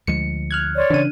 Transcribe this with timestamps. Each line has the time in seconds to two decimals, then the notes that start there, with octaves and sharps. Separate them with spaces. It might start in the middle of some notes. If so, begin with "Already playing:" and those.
0.07 D2 F3 G#3 C#7
0.51 F6 F#6 G#6
0.76 C#5 D5 C6
0.90 C#3 E3 D4 D#7